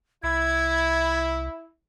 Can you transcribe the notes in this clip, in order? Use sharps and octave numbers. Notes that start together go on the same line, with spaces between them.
C2 E4 G#6